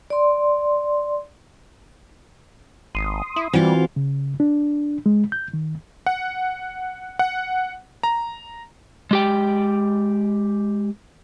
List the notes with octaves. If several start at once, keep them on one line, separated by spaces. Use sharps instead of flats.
D5 C6
G#1 C6 D#6
E4
E3 G3 C4 F4 F#4
C#3
D4
G#3
G6
D#3
F#5
F#5
A#5
G#3 G4 G5